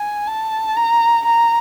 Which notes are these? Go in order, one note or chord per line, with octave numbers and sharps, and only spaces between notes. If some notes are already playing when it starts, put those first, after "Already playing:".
Already playing: G#5
A5
A#5
A#5